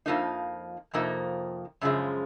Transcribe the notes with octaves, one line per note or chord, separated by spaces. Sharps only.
F2 C3 F3 A#3 D#4
F2 C3 F3 A#3 D#4
F#2 C#3 F3 G#3